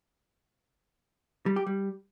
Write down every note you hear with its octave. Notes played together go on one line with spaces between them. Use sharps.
G3
G4
G3